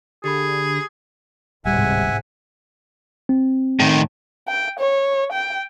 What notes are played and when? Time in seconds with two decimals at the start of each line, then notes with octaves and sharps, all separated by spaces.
0.24 D3 G4 G#4 B5
1.65 D1 A1 G#2 C3 G3 E5 F#5 G#5
3.29 C4
3.80 A2 D#3
4.48 G5
4.80 C#5
5.33 G5